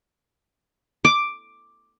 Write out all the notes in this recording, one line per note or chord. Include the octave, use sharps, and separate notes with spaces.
D6